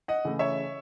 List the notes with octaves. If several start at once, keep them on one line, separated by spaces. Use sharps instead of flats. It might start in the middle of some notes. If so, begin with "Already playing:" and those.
D#5 F#5
C#3 E3 A3
C#5 E5